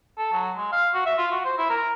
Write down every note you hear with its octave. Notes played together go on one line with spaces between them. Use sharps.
A4
F#3
G#3
F5
F#4
E5
F4
F#4
C5
E4
A#4